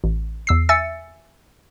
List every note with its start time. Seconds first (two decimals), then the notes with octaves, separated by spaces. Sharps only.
0.04 A1
0.47 E2 E6 C7
0.69 E5 G#5 E6 A6 C#7